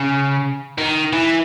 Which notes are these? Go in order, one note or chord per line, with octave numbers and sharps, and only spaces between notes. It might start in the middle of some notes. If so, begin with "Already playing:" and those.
Already playing: C#3
D#3
E3